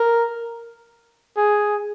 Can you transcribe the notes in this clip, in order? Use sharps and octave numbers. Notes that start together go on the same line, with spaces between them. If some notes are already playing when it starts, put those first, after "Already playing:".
Already playing: A#4
G#4